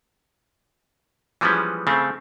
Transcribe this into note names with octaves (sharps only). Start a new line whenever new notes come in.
E3 F3 G3 G#3 B3 C#4
C#3 A3 C4